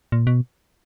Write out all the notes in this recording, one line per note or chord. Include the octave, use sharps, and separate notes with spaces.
A#2
B2